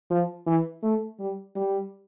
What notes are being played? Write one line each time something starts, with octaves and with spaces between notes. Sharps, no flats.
F3
E3
A3
G3
G3